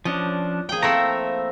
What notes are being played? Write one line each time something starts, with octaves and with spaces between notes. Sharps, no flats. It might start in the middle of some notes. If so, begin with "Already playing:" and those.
F3 C#4 D4 D#5
F3 A#3 G#4 G5
A3 C4 E4 E5 A#5